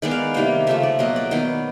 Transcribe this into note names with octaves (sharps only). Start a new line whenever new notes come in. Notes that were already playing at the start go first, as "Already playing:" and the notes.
D#3 G#3 B3 D5
F5
C3 D#3 G3 A#3 F5
C#3 F3 A3 E5
D5
B2 F#3 A#3 D#5
D5
D#3 F#3 B3